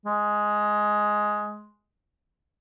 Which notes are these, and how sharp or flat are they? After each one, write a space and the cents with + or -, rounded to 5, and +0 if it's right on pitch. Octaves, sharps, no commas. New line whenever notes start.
G#3 +10